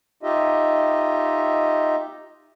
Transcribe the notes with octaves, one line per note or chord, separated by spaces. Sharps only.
D#4 F4 G4 D#5 E5